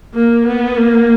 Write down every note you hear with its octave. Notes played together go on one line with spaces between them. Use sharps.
A#3
B3
A#3